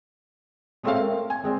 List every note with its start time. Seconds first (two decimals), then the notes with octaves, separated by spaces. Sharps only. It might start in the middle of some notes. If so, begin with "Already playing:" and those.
0.83 G#3 A3 C4 C#4 E5 F5
0.98 A#4
1.30 G#5
1.44 G#3 C4 D5